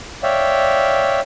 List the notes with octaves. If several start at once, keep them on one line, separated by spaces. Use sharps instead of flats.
C#5 D5 E5 F5 G5